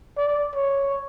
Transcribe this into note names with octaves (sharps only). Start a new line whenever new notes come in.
D5
C#5